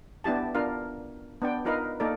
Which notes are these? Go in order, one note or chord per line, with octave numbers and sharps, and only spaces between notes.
B3 D4 E4 G4 A5
B3 D4 F4 A#4 F5
B3 D4 G5
D#4 F4 A#4 B4 D#5 F5
A#3 D#4 A4 A#4 D5